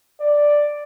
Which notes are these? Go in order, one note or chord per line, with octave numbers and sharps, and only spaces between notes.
D5